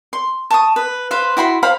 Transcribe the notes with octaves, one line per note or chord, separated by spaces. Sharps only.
C6
A5 C#6 D#6
B4
B4 C5 F5
E4 F#4 B5 C6
C5 F5 B5